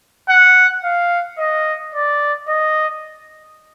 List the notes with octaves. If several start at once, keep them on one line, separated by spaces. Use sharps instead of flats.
F#5
F5
D#5
D5
D#5